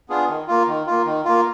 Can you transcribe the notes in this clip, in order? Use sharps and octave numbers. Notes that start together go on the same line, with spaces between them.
B3 D4 F4 G#4
D#3
A#3 F4
D#3
A#3 F4
D#3
A#3 F4